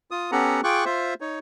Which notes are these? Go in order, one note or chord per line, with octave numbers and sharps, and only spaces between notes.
F4 D#6
B3 C#4 G4 A4 F#5 A#5
F4 G#4 G5 C#6 D6 F#6
F4 C5 E5
D#4 C#5